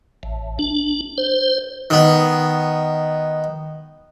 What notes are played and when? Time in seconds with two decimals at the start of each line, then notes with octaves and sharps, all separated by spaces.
0.23 A1
0.59 D4
1.18 C5
1.90 D#3 B3